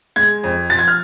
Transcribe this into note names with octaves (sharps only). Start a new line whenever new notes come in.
G#3 G#6
F2
F3 A6
G#6
F6